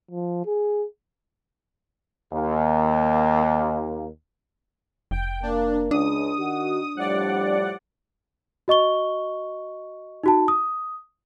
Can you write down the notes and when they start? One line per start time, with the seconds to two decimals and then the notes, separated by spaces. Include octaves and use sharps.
0.11 F3
0.46 G#4
2.32 D#2 A#3
5.11 F1 G5
5.42 A#3 D4 A#4
5.91 C#2 D4 D#6
6.37 D#3 F#4
6.97 A2 F3 G3 D5 F#5
8.68 F#4 D#5 C#6 G7
10.23 D#4 F#4 A5
10.48 D#6